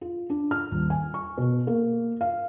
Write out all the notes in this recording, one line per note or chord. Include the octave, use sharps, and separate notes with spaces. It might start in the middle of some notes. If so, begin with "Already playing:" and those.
F4
D4
F6
D#1
G#5
C#6
B2
A#3
F5